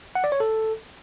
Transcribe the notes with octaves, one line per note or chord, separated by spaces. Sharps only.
F#5
D5
C#5
A4